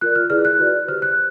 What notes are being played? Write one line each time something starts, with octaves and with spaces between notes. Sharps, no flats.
F4 A#4 D5 F#6
F6
E4 G#4 B4 D5 F6
F#6
F#4 B4 D5
G4 C5 F6
F#6